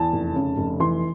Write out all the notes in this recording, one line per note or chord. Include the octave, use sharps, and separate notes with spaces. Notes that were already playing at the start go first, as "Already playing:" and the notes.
Already playing: E2 A5
F1
C#3
F1
E3 C6